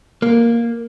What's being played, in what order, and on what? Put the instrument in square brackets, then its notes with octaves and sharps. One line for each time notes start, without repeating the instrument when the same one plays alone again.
[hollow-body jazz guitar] A#3